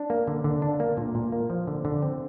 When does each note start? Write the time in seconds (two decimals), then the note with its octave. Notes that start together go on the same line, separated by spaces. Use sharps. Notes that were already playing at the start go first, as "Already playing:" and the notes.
Already playing: D4
0.10 A#3
0.27 D3
0.44 D3
0.62 D4
0.80 A#3
0.97 A#2
1.15 A#2
1.32 A#3
1.50 F3
1.67 D3
1.85 D3
2.02 C4